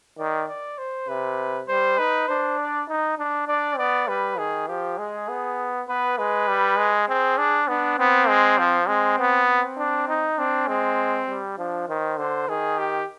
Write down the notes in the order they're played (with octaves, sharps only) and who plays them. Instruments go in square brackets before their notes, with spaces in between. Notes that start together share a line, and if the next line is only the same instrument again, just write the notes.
[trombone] D#3 [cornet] D5
[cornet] D5
C5
[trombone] C3 [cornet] B4
[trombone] G3 [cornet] C5
[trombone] D#4 [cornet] B4
[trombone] D4 [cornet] C5
[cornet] D5
[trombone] D#4
D4
[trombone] D4 [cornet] D5
[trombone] B3 [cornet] D5
[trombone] G3 [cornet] B4
[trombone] D#3 [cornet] G#4
[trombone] F3 [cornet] G4
[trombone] G#3 [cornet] G#4
[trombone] B3
[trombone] B3 [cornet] B4
[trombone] G#3 [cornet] B4
[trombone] G3
G#3
[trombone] C4 [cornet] G#4
[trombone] D4
[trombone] B3 [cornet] D4
[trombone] B3 [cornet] C4
[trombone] G#3
F3
[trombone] G#3 [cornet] C4
[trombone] B3
[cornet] C4
[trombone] D4
D#4
[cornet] C4 [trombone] D4
[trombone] G#3 [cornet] C4
[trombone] G3
[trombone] F3 [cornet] D4
[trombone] D#3 [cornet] C5
[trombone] D3 [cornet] C5
[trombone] D#3 [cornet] G#4
[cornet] G4